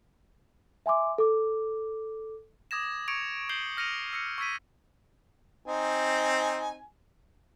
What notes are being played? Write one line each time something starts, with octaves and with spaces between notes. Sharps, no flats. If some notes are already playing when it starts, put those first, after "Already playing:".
E5 G#5 C6 D6
A4 D6
D6 D#6 G#6 A#6 E7
C#6 G#6 C#7 D7 F7
C#6 G6 C7 F#7 G7
F6 A#6 C#7 D#7 F7
E6 A#6 C#7
C#6 E6 G#6 B6 D#7
C4 D#4 G#5